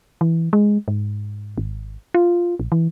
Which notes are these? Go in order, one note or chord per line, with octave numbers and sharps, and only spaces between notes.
E3
G#3
G#2
G#1
F4
A#1
E3